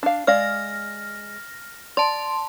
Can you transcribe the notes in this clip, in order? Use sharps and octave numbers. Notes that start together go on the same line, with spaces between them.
D4 F5
G#3 D5 F5 F6 A#6
D5 A5 C6